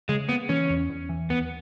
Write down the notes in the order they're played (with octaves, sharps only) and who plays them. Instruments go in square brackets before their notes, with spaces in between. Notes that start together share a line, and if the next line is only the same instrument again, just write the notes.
[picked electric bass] C#3 [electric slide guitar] G#3
[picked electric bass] A#3 [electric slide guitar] B3
[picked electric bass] E3 [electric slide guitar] C#4
[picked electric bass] E2
E2
E3
[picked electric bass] D#2 [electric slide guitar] B3